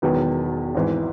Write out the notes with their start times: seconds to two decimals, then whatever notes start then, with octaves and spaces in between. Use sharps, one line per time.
0.02 E1 E2 D#3 F#3 B3
0.75 G#1 G#2 E3